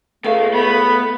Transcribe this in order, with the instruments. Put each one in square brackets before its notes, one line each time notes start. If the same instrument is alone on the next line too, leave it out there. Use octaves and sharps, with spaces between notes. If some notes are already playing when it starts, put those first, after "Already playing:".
[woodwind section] C#2 C#3 A3 [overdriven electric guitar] B3 F5 [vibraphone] A4
[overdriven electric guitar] B3 [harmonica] B5